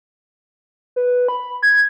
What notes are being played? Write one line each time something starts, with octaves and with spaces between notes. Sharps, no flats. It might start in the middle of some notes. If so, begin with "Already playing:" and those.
B4
B5
G#6